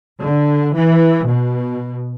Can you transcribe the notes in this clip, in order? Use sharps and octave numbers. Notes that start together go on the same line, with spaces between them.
D3
E3
B2